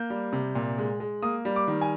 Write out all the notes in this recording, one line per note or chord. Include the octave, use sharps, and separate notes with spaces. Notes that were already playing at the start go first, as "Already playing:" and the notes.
Already playing: A#3 G6
G3
C3
A#2
G#3
G#3
A#3 D#6
G3
D6
D#3
G#5